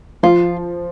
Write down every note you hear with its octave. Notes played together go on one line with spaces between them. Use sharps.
F3 F4